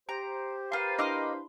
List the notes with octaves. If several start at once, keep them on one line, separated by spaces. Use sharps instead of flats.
G4 C5 A#5 D7
F4 A#4 B4 F5 C6 C7
D4 E4 D#5 C6 D6 F6